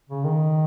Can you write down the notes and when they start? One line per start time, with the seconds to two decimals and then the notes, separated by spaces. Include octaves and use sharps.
0.09 C#3
0.24 D#3